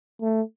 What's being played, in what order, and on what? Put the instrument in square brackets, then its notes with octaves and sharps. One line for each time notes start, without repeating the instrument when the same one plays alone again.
[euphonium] A3